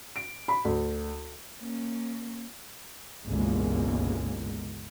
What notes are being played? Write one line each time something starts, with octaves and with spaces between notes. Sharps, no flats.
D7
B5
D2
A#3 C#4
G1 C#2 B2 E3 G#3 A#3